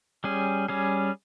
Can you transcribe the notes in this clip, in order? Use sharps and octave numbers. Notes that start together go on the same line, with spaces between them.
G3 C#4 G#4
G3 C#4 G#4